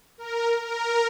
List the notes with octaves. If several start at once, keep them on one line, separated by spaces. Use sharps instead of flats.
A#4
A#4